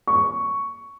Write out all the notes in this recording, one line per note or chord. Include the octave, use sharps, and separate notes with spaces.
C#6